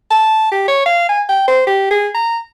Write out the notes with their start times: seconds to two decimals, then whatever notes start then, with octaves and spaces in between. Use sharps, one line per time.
0.11 A5
0.52 G4
0.68 C#5
0.86 F5
1.09 G#5
1.29 G5
1.48 C5
1.67 G4
1.91 G#4
2.15 A#5